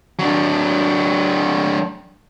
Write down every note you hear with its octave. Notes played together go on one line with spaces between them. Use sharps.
F#3 D4